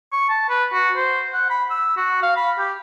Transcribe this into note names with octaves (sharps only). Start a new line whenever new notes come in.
C#6
A5
B4
F#4
C5
F#5
B5
E6
F#4
F5
B5
G4